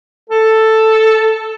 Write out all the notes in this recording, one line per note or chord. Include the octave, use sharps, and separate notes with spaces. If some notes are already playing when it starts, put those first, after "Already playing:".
A4